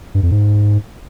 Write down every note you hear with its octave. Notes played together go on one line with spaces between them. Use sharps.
G2
F2
G#2